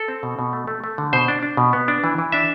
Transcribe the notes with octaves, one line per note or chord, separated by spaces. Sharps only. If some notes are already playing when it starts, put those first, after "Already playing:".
Already playing: A4
C4
B2
B2
A3
A3
A3
D3
B2 C5
D4
D4
B2
B3
D4
E3
E3
D4 E5